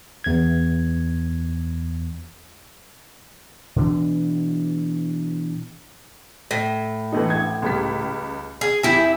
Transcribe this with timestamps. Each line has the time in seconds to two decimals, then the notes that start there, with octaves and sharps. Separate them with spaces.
0.24 E2 G#6
3.76 B2 E3 D4
6.51 A2
7.12 E3 A3 D#4
7.30 A1 G#6
7.62 C#2 G3 B6
8.61 G#4
8.83 F2 E4 G4 E5 G#5